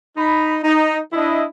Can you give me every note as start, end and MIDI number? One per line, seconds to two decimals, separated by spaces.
0.17 0.58 63
0.17 0.58 83
0.63 0.98 63
1.13 1.44 62
1.13 1.44 64
1.13 1.44 75